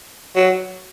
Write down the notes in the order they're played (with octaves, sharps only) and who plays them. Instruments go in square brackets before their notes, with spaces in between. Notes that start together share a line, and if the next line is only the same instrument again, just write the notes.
[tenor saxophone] F#3